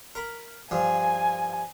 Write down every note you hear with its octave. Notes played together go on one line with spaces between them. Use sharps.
A#4 B5
G2 F3 G#5